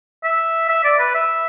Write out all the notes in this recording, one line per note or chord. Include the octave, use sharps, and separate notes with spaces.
E5
E5
D5
B4
E5